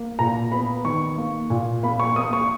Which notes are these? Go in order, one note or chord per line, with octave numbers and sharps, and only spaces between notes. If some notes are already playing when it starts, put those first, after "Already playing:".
Already playing: A#3
A#2 A#5
B3 B5
D#3 C#6
A#3
A#2
A#3 B5
C#6
A#3 D#6
C#6